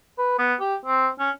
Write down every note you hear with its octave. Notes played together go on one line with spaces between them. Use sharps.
B4
B3
G4
C4
C#4